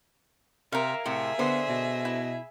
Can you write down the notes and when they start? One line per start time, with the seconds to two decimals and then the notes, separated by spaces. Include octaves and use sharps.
0.72 C3 A#4 E5 F5
1.06 A2 C3 G#4 E5
1.39 D3 B3 C5
1.69 B2
2.05 E4